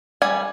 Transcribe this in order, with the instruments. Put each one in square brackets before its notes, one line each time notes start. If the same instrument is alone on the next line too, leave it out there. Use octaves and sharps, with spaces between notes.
[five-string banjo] G3 G#5